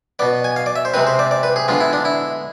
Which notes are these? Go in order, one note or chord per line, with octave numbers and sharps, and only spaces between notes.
B2 B3 D5
G#5
F5
D5
E5
C5
C3 G#3 C4 B4
C5
D5
D5
B4
G#4
D3 G#3 B3 F4
E4
D4
E4